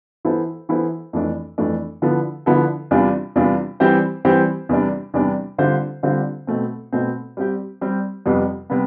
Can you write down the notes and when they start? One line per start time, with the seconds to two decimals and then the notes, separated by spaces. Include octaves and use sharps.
0.25 E3 B3 E4 A4 C5
0.69 E3 B3 E4 A4 C5
1.13 F2 E3 A3 D4
1.58 F2 E3 A3 D4
2.02 D3 F3 B3 E4 A4
2.46 D3 F3 B3 E4 A4
2.91 E2 C3 G3 D4 F4
3.36 E2 C3 G3 D4 F4
3.80 E3 G3 C4 G4 C5
4.25 E3 G3 C4 G4 C5
4.69 E2 C3 G3 D4
5.14 E2 C3 G3 D4
5.58 D3 G3 C4 F4 C5
6.03 D3 G3 C4 F4 C5
6.47 B2 A3 C4
6.92 B2 A3 C4
7.37 G3 C4 G4
7.81 G3 C4 G4
8.26 F2 C3 G3 B3
8.70 C3 G3 B3